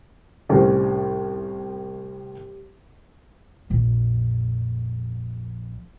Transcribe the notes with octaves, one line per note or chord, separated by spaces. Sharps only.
C2 A2 G3 C#4 C5
A#1 F2